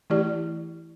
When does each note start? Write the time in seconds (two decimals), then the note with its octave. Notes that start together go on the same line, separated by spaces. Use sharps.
0.10 E3 A3 E4 G4 D5